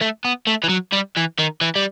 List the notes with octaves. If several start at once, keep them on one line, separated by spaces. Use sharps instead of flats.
A3
B3
A3
E3
F#3
G3
E3
D#3
E3
G3